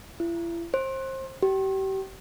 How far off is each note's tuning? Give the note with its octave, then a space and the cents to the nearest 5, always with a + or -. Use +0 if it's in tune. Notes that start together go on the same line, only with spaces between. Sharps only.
E4 +40
C5 +25
G4 -35